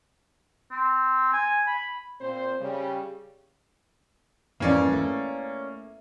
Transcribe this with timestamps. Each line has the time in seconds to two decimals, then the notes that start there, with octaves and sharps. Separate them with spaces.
0.71 C4
1.33 G#5
1.67 B5
2.20 A#2 C4 C5
2.61 C#3 G3
4.60 F2 G#2 E3 A#3 C#4 D5
4.92 A3